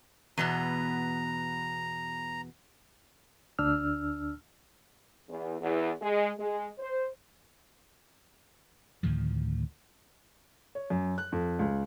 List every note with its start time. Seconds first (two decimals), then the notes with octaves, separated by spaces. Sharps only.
0.37 E2 B2 B3 A#5
3.59 D2 D4 E6 F6
5.29 E2
5.60 E2
6.01 G#3
6.38 G#3
6.79 C5
9.03 D2 A2 D#3 F3
10.75 C#5
10.90 F#2
11.18 F#6
11.32 F2
11.59 C#2